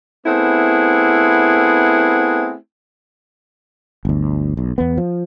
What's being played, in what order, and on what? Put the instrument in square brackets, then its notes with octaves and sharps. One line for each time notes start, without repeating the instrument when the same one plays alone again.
[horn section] A3 B3 C4 E4 G#4 F#5
[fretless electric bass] G1 D2
B1
E2 B3
F3